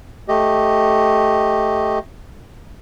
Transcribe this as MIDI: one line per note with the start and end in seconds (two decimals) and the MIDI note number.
0.28 1.99 57
0.28 1.99 67
0.28 1.99 75